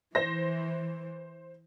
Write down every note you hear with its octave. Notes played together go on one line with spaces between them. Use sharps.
E3 C5 A#6